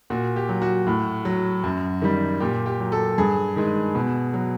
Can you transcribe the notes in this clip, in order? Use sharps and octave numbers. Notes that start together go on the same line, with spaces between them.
A#2 F#4
G4
F#3
F#4
A2
F#3
F#2
D#3 G3
A#2 G4
G4
F#3
A4
G2 G#4
D#3 G#3
B2
F#3